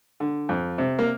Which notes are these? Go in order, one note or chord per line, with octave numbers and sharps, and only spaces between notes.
D3
F2
C3
A#3